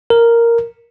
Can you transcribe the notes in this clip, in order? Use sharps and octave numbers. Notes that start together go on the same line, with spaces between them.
A#4